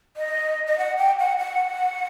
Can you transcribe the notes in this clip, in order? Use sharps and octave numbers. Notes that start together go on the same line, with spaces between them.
D#5
D#5
F#5
G5
F#5
F#5